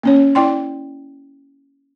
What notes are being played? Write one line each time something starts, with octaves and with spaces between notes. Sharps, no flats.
A#3 C#4 C#5
E4 D5 G5 C6